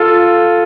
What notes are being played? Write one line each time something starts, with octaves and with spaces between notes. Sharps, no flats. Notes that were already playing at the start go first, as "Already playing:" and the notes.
Already playing: F4 A4